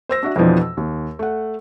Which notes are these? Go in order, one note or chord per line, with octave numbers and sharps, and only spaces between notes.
C5 E6 A#6
D4 F#4 E5
F2 B2 E3 F3 D4
E6
D#2
A3 F#5